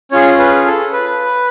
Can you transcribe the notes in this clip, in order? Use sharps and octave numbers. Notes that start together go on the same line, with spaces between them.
C#4 F4 G#4 C#5
B4
A4
B4